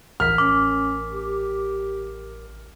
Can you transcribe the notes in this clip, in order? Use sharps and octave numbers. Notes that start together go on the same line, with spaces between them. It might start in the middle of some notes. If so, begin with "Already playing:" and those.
A1 A#4 F6 B6
C#4 D6
G4